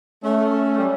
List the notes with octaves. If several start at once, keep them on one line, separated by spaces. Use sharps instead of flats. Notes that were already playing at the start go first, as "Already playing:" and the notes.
A3 C#4
G3